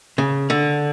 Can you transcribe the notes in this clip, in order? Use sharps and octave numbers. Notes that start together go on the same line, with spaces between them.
C#3
D3